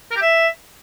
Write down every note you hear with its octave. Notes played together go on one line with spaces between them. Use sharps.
A#4
G4
E5